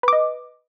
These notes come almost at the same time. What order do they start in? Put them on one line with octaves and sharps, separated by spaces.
B4 D6 D#5